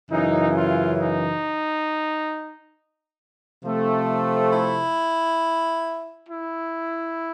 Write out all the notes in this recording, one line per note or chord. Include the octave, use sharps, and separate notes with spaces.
F#2 C#3 E3 D#4
F4
D#4
C3 F3 A3 C4
E4
E4